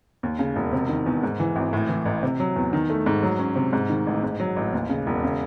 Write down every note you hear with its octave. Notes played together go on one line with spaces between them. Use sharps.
D#2
C#3
E1
C3
D#3
E2
G#2
E3
G#1
A2
E3
A1
C3
F#3
E2
D#3
A3
G#2
F#3
C#4
C3
G#2
D#3
A1
G#2
F#3
A1
D#2
C#3
E1
C#3